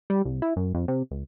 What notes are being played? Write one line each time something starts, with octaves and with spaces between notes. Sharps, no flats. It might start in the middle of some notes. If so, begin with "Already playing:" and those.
G3
C2
E4
F#2
F2
C3
C#2